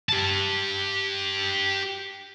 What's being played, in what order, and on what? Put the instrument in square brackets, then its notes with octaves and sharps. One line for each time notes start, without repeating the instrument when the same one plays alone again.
[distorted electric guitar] G4 A5